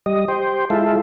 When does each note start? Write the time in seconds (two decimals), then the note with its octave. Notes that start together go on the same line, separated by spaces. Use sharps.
0.06 G3 D#5
0.28 G4 C5
0.70 G#3 E4 F4 A4